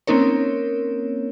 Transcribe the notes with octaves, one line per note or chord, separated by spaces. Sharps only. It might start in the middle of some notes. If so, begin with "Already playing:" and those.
A#3 C4 C#4 D#4 A#4 C#5